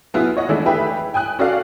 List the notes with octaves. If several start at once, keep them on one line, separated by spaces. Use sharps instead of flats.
F#3 B3 E4 F4 G#4
C#5 D#5 F#5
E3 G#3 A3 D4 E4
G4 G#4 B4 E5 G5
G5 G#5 D#6 F#6
C#4 F#4 A4 D5 F5